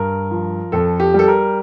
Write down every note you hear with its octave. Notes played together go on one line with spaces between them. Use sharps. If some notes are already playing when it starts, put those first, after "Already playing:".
Already playing: G2 A#4
F3
F2 A4
G4
G3 A4
A#4